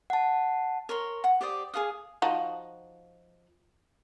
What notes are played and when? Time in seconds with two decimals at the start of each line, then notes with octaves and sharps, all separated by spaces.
0.10 F#5 A5
0.89 A#4 C#5 C6
1.24 F#5
1.41 G4 C5 D5 D#6
1.74 G#4 A4 F5 D#6
2.22 F3 D#4 F#4